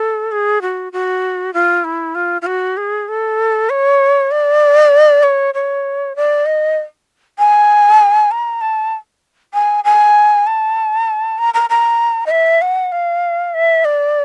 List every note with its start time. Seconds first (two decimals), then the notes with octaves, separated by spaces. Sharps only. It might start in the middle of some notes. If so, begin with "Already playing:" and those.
Already playing: A4
0.31 G#4
0.62 F#4
0.93 F#4
1.54 F4
1.84 E4
2.15 F4
2.42 F4
2.46 F#4
2.77 G#4
3.08 A4
3.70 C#5
4.31 D5
5.23 C#5
5.54 C#5
6.16 D5
6.46 D#5
7.39 G#5
8.31 A#5
8.61 A5
9.54 G#5
9.84 G#5
10.47 A5
11.38 A#5
11.54 A#5
11.70 A#5
12.26 D#5
12.31 E5
12.62 F#5
12.92 F5
13.54 E5
13.85 D5